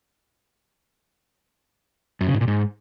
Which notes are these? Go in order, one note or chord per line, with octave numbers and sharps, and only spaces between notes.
F#2
C#3
G#2
A#2
G#2